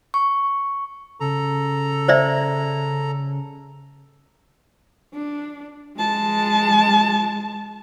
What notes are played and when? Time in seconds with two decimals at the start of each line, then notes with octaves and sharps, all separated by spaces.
0.14 C#6
1.20 C#3 A4 A#5
2.08 C5 D5 E5
5.14 D4
5.98 G#3 A5